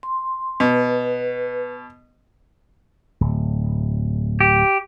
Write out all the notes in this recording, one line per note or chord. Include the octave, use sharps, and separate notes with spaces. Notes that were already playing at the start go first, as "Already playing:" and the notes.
C6
B2 B4
D1
G4